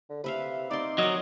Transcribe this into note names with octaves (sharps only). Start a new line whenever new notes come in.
D3
C3 B4 E5 F5
C4 D#4 D5 C6
F#3 A#4 D5 D#5